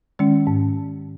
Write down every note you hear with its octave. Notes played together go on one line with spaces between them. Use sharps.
D#3 G#3 C#4
G#2